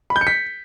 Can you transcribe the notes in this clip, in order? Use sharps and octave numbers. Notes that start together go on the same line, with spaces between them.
B5
G6
C#7
B6